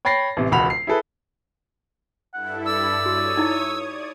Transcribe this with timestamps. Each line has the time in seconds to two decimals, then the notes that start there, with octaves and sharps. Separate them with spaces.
0.05 C#5 G5 B5 A6 A#6 C7
0.37 A1 C3
0.51 E1 C#2 F#4 B5 F7
0.70 C7
0.87 E4 G#4 A4 B4
2.34 G2 E4 A4 F#5
2.66 D5 E6
3.06 F#4 C#5 D#6 G#6
3.37 D#4 E4 D#5
3.83 D5